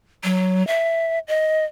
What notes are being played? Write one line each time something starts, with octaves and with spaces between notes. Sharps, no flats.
F#3
E5
D#5